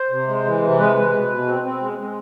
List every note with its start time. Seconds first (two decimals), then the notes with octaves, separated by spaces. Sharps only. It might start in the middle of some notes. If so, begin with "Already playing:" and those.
Already playing: C5
0.10 C3
0.27 G#3
0.45 E3
0.62 C3
0.78 G#3 B4
0.96 G#3
1.12 B2
1.30 B2
1.46 C4
1.63 C4
1.81 G#3
1.99 G#3